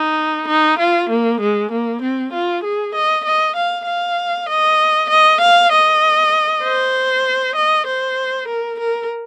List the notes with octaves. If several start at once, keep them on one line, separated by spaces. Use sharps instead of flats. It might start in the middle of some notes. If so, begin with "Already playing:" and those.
Already playing: D#4
D#4
F4
A#3
G#3
A#3
C4
F4
G#4
D#5
D#5
F5
F5
D#5
D#5
F5
D#5
C5
D#5
C5
A#4
A#4